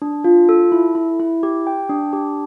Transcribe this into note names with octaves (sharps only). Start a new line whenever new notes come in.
D4
F4
A4
E4
E4
E4
G4
G5
D4
G4